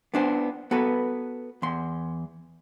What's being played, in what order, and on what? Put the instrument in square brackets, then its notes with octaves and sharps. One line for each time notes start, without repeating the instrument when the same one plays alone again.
[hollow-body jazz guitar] B3 D4 C5
B3 F#4 A4 B4
E2 C6